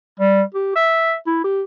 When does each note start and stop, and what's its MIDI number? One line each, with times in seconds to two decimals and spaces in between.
0.20 0.42 55
0.54 0.75 67
0.76 1.15 76
1.27 1.40 64
1.44 1.62 67